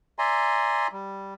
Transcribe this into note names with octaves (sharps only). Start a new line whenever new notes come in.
D5 E5 G#5 A#5 C6
G3